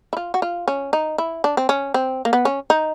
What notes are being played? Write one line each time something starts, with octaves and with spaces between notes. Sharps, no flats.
E4
F4
F#4
F4
C#4
D#4
E4
D4
C4
C#4
C4
A#3
B3
C#4
D#4